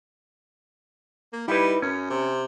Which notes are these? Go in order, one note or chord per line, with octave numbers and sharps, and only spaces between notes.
A#3
G3 D#4 E4 B4
F#2 C#4
C3